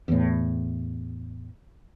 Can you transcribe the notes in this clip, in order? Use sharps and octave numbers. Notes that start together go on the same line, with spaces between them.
E2 A2